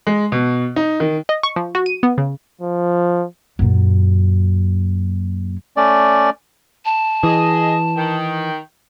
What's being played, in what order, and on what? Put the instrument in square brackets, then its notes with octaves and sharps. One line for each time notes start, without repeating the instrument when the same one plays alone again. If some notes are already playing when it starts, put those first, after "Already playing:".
[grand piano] G#3
B2
D#4
D#3
[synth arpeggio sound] D#5
C#6
F3
F#4
D#7
B3
C#3
[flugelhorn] F3
[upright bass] F#2 A#2
[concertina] A3 C#4 D5
[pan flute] A5
[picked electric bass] E3 [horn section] G#4 D#5
[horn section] D#3 G5